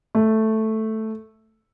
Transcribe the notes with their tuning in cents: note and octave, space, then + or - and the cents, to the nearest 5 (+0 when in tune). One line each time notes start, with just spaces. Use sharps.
A3 +0